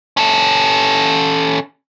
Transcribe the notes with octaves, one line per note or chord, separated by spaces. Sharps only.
C#4 A4